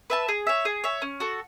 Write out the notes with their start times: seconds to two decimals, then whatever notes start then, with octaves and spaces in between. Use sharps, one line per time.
0.10 B4 E5 A5
0.28 G#4
0.47 C#5 E5
0.65 G#4
0.84 C#5 E5
1.02 C#4
1.20 F#4 A4